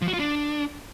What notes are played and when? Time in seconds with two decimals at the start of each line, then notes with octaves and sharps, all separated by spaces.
0.02 F3
0.08 F#4
0.13 F4
0.19 D4